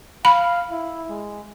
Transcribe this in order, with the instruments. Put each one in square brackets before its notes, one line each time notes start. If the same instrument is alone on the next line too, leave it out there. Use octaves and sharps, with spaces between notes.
[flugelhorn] F5 [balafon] B5
[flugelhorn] E4
G#3